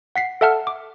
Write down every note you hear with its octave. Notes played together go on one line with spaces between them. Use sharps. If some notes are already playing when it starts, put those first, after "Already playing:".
F#5 B6 C7
A4 E5 F#5 A5 F6
D6